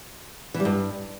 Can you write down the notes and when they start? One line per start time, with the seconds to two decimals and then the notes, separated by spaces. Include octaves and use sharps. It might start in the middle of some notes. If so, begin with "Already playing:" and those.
0.54 E3
0.60 G3
0.65 G2